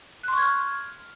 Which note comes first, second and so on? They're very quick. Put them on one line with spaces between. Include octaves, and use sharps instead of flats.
F#6 C6 C#6 G#6 F6